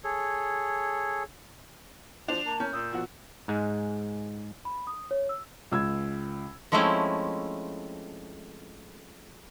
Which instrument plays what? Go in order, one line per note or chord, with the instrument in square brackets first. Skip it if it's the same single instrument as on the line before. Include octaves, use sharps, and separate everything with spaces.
[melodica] G#4 A4 C#5
[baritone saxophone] F3 [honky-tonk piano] D4 [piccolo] F7
[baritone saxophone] A#3 [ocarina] A5
[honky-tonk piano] C#4 [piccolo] G6
[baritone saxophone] A#2 [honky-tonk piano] D#6 [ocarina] E6
[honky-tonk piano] B2 F3 F#4
[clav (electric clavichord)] G#2 G#3
[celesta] B5
D#6
C#5
E6
[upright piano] C#2 E6 G#6
[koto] F3 G#3 A3 C4 C#4 E4